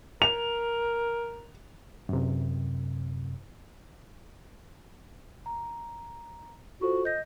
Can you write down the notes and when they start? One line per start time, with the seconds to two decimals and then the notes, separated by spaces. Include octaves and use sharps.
0.22 A#4 F7
2.09 F#2 C3
5.46 A#5
6.81 F4 F#4 A4 C5
7.05 D#5 G6 A#6